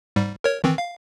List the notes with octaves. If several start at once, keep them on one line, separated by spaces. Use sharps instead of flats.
G#2 G3
A#4 C#5
D#3 E3 C4
F5